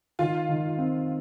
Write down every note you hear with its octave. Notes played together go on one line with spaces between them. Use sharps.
D#3 F4
D#3
C4